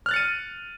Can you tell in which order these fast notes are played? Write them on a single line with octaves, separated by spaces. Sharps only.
F6 F#6 A6 C#7 D#7